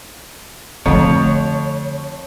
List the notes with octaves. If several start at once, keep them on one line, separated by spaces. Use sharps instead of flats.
F2 D3 A3 C#5